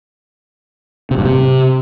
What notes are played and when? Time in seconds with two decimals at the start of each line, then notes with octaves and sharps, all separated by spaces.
1.11 C3
1.18 G2
1.25 C3